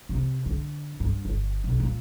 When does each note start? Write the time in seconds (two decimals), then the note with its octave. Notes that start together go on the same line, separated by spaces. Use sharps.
0.09 C3 C4
0.46 D3
1.00 G2
1.25 G1
1.64 B1
1.80 A#2